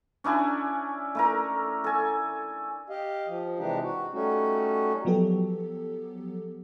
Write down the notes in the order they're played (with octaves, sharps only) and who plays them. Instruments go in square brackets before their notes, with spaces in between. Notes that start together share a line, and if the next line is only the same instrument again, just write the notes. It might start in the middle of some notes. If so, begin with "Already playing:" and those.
[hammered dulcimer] C#4 D4 E4 G#5
A3 E4 A#4
A4 G#5
[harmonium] G4 D#5 F5
F3
C3 E3 G#3 D4 D#4 G4
F#4
G3 A3 C#4 D#4 F#4
[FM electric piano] F3 F#3 B3 G4 A4